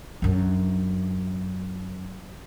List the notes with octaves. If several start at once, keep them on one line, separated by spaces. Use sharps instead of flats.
F#2 D4